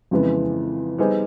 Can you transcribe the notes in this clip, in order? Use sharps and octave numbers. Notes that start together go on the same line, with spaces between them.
F2 C#3 E3 G#3 B3
G3 B3 D#4 G#4 C5